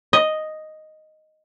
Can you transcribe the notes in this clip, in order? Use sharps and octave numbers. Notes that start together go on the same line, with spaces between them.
D#5